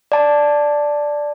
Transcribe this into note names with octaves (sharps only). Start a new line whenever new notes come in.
D5 A5